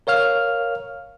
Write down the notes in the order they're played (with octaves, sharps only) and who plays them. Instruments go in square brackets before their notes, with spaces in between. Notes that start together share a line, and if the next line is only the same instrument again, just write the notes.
[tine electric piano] A#4 C#5 F5 F6